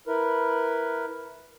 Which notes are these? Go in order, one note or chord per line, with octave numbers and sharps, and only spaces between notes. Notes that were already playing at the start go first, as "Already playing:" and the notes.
E4 A#4 B4